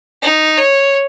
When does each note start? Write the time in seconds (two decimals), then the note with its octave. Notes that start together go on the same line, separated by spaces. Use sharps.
0.23 D#4
0.58 C#5